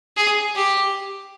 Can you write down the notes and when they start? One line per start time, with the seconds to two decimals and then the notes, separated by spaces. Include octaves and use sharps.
0.17 G#4
0.55 G4